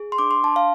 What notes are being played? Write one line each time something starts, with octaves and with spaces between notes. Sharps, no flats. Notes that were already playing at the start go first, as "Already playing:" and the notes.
Already playing: G#4
C6
D4 D6
C6
D4 A5
F5